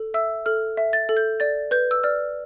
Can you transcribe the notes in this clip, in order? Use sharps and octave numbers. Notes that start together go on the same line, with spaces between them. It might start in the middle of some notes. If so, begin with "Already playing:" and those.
Already playing: A4
E5 E6
A4 F6
E5
A6
A4
G6
D5 A6
B4 G6
E6
D5 F6